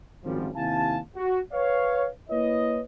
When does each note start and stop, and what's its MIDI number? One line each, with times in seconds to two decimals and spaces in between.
0.24 0.49 32
0.24 0.49 42
0.24 0.49 53
0.24 0.49 55
0.55 0.98 39
0.55 0.98 48
0.55 0.98 64
0.55 0.98 77
0.55 0.98 80
0.55 0.98 81
1.16 1.39 66
1.52 2.08 71
1.52 2.08 73
1.52 2.08 77
2.30 2.81 58
2.30 2.81 64
2.30 2.81 71
2.30 2.81 73
2.30 2.81 75